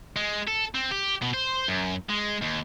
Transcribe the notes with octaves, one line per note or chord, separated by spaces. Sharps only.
G#3
A4
C4
G4
B2
C5
F#2
G#3
D#2